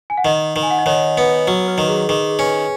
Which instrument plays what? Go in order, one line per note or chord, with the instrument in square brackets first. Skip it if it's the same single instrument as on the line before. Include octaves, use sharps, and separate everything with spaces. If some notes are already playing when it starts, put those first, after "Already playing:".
[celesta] G#5
F#5
[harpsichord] D#3 [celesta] D#5
[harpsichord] D#3
[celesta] G#5
F#5
D#5
[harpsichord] D#3 [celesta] C#5
[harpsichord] B3
[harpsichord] F#3 [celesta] B4
[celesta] B4
[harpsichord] D#3
[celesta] G#4
[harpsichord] D#3 [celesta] G#4
[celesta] G#4
[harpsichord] C#4 [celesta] B4